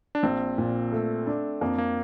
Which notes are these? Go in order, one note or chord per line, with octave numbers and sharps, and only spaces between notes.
D4
A#1 C4
A#2
A3
D4
F2 A#3
A#3